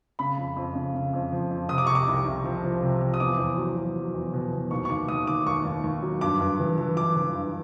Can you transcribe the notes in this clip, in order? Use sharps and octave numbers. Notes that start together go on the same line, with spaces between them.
C#3 B5
F2
F2
C#3
C#3
F2
F3
F2
C3 D#6
D6
C3 C#6
D6
C2
C2
F3
F3
C3
F3
D#6
E2 D6
E2
F#3
F#3
F#3
E2
B2
B2
D#2 C#6
C#6
D#2 D6
D#2 D#6
D#3 D6
D#2 C#6
D#2
D#2
F#3
G2 D6
G2
E3
E3
E3 D6
E3
G2